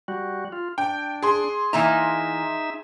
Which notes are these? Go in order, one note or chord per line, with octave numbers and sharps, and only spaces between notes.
G3 F#4
F4
D4 G5
G#4 C6
E3 A#3 D#4 E5 A#5